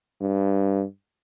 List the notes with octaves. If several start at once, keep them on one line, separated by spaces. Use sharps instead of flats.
G2